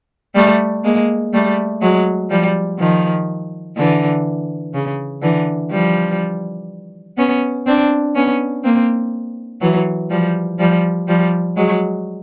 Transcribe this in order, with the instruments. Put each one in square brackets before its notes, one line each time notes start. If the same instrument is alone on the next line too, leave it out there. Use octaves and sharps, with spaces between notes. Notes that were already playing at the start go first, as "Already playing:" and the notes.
[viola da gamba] G3 A3
G#3 A#3
G3 A3
F#3 G#3
F3 G3
D#3 F3
D3 E3
C#3
D3 E3
F3 G3
B3 C#4
C4 D4
B3 C#4
A#3 C4
E3 F#3
F3 G3
F3 G3
F3 G3
F#3 G#3